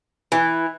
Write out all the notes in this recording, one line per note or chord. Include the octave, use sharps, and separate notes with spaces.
E3